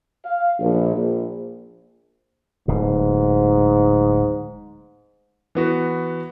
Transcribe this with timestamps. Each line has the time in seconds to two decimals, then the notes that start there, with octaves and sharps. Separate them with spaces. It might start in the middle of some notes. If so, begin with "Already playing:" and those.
0.25 F5
0.60 A#1
0.96 A#1
2.68 D1 G#2 B2
5.55 E3 B3 F#4